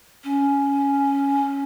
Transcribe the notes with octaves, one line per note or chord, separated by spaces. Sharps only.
C#4